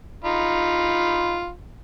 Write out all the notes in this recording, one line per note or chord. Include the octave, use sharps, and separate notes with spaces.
D#4 F4 B5